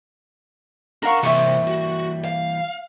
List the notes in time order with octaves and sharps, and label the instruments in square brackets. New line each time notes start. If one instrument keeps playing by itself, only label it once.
[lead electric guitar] D4 F#5 [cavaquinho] A#4 F5 C#6
[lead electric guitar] C3 [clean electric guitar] E3 G3 A#3 [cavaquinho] E5 C#6
[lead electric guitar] F#4
F5